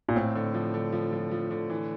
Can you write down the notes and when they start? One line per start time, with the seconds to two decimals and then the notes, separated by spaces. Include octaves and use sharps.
0.09 A#2
0.16 A2 C4
0.35 D3
0.54 F3
0.74 D3
0.92 F3
1.13 F3
1.31 F3
1.51 D3
1.70 E3